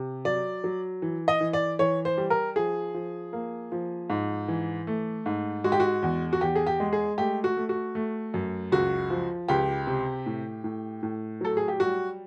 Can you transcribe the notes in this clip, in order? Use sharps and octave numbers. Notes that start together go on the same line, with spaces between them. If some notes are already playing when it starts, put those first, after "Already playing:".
Already playing: C3
F#3 D5
F#3
E3
D#5
E3
D5
E3 C#5
C5
G3
A#4
F3 G#4
F3
A#3
F3
G#2
E3
A3
G#2
G#3 F#4
G4
F#4
E2
F#4
E2 G4
G#4
G4
G#3
G#4
A3 G4
F#4
A3
F#4
A3
F#2
C#2 F#4
F3
C#2 G4
C3
A2
A2
A2
F#3 A4
G#4
G4
G3 F#4